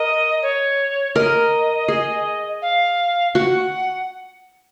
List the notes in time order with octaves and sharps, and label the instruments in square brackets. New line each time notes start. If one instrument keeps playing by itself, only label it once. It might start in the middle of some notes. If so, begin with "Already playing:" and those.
Already playing: [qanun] A#4 [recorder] D#5
[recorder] C#5
[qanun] A#4 [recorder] D#5
[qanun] G#4
[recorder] F5
[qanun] F#4 [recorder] F#5